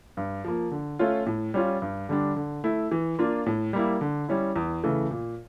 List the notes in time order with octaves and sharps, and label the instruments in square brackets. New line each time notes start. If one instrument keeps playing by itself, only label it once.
[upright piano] G2
F3 A#3
D3
A3 C#4 F4
A2
G3 C#4 F4
G2
D3 G3 D4
D3
A3 E4
E3
A#3 D4 F4
A2
G3 A#3 E4
D3
G3 C#4 E4
E2
C#3 E3 A3
A#2